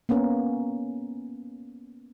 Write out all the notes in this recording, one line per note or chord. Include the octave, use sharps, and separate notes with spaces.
A#3 B3 C#4 A#4